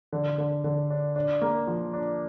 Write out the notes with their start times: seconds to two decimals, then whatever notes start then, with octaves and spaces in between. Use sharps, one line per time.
0.13 D3
0.38 D3
0.64 D3
0.90 D4
1.16 D4
1.41 A#3
1.67 F3
1.93 D4